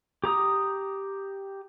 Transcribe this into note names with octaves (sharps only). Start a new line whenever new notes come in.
G4 A#5 D#6